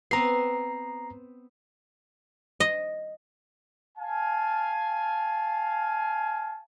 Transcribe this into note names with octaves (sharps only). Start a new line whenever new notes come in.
B3 C4 A#5 C7
D#5
F5 G#5 A5